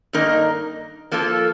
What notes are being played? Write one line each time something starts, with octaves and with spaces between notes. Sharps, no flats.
G2 D#3 A#3 D#4 A#4
F3 A#3 F4 A4